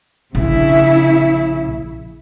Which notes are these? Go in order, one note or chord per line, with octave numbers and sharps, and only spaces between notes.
A#1 C#3 E4